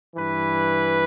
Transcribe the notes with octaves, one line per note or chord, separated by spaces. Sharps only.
G2 E3 B4